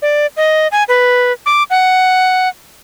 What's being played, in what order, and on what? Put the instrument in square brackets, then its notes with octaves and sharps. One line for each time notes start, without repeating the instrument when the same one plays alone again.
[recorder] D5
D#5
G#5
B4
D6
F#5